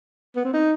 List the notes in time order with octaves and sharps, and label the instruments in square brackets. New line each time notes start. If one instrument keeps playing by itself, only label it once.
[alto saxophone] B3
C4
D#4